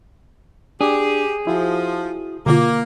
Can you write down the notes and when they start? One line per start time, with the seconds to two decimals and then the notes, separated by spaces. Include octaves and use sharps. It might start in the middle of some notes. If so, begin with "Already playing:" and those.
0.81 D4 G4 G#4
1.47 F3 E4 F#4
2.46 B2 D3 A#3 F4